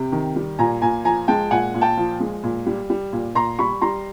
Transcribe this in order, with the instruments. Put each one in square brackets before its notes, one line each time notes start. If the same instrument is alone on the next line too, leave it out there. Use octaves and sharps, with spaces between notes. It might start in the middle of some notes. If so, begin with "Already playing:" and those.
Already playing: [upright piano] C3 G5
D#3
G3
A#2 G#5 A#5
A#2 G#5 A#5
F3 G#5 A#5
G#3 G5 A5
A#2 F#5 G#5
A#2
G5 A5
F3
G#3
A#2
G3
G3
A#2
A#2 A#5 C6
G3 B5 C#6
G3 A#5 C6